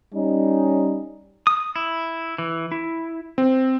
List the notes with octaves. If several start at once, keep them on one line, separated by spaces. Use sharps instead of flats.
G3 C#4 D#4
D#6
E4
E3
E4
C4